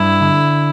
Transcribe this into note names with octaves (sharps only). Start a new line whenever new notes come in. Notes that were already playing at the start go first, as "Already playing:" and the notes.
Already playing: G2 E4
D3